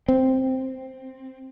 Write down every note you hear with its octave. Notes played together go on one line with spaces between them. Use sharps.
C4